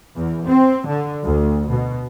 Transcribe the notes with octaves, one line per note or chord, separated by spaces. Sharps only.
E2
C4
D3
D2
B2